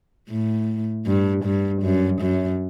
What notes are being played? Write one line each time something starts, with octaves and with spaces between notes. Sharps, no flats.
A2
G2
G2
F#2
F#2